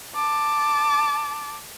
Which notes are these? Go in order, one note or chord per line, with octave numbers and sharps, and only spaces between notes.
A5 D6